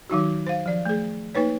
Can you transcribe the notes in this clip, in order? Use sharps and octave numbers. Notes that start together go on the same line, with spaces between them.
D#3 F#3 D#4 F#4
C5 F5
F3 D5
A3 G#4
A#3 D#4 B4 C#5